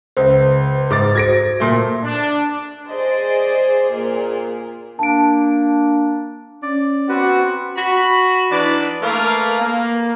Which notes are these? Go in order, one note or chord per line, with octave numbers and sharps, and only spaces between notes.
C#2 C5 E5
E5
G#2 G#4 C5 E5 D6 A6
F#4 A4 C5 G#6 A#6 D7
A#2 A3
D4
G#4 C5 D5 D#5
A#2 G#4
A#3 D4 A5 D7
C#4 D5
B3 C4 F#4 B4
F#4 B5
E3 D4 D#4 B4 D5
A3 A#3 A#4 B4 F5
A#3